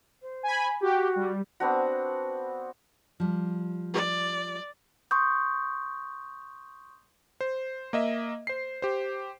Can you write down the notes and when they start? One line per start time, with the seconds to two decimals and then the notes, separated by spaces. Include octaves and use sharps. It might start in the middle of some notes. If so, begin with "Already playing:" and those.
0.22 C5
0.43 G#5 B5
0.81 F#4 G4
1.16 G3
1.60 B3 C4 D4 F#4
3.20 F3 G3
3.93 D5
5.11 C6 C#6 D#6 G6
7.41 C5
7.93 A#3 D#5 E5
8.47 C5 C7
8.82 G4 C5